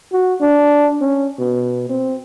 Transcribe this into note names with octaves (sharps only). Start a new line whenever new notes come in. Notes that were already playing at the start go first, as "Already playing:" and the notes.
F#4
D4
C#4
B2
C4